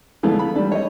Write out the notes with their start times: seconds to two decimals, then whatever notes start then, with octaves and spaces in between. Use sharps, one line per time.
0.23 D3 E3 F3 G#3 A3 B3
0.39 B5
0.56 G3 D4
0.72 C#5 D#5